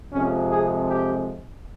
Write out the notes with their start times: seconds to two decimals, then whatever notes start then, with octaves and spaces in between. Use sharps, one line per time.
0.12 F2 C3 F3 G#3 C#4
0.50 G#4
0.88 G4